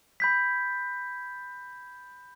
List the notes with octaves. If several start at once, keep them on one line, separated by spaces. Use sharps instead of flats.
B5 G6 B6